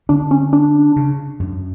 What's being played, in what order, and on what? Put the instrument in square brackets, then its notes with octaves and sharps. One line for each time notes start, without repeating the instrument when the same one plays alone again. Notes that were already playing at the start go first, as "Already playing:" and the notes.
[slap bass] D3 [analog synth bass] D4
[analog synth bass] C#4
D4
[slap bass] C#3
F#2